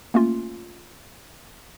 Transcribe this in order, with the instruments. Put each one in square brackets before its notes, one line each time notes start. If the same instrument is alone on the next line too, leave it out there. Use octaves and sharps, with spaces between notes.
[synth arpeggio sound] A3 A#3 C#4 F4